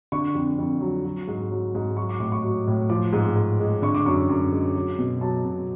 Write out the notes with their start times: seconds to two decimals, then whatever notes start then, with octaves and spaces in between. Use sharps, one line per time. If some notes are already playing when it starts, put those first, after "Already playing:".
0.12 D3 C#6
0.35 F2
0.58 F2
0.81 F#3
1.05 F#3
1.28 G#2
1.51 F#3
1.75 G#2
1.97 F#3 C#6
2.09 D6
2.20 A2 D6
2.32 C#6
2.44 F#3
2.67 A2
2.90 F3 D6
3.13 G#2
3.36 G#2
3.60 G#3
3.82 D3 C#6
3.95 D6
4.06 F#2 C#6
4.29 F#2
4.52 G#3
4.76 F#3
4.99 B2
5.21 F#3 A5
5.45 B2